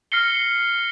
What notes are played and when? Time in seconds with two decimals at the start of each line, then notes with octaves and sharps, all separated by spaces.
0.12 F6 A#6 C7 C#7 G7